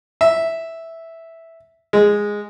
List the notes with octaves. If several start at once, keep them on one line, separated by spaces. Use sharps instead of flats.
E5
G#3